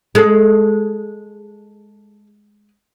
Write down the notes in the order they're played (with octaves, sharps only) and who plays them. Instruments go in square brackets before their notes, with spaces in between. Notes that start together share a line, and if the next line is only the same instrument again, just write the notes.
[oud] G#3 [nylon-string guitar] G#4 A4